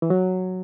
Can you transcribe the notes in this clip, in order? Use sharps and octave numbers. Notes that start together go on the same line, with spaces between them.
E3
F#3